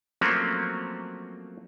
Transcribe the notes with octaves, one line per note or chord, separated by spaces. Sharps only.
F3 F#3 A3 A#3 C4 C#4